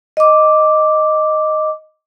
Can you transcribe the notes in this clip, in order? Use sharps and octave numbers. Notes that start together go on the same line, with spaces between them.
D#5 D6